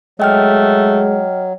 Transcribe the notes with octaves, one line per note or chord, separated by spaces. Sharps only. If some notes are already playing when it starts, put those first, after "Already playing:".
F#3 G#3 A3 D#5 G5 F6